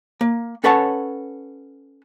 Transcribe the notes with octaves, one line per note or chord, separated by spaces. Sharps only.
A#3
C#4 A4 B4 C#5 F#5 A5